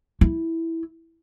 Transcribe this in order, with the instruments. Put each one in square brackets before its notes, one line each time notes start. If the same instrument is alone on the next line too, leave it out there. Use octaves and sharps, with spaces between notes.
[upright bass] E4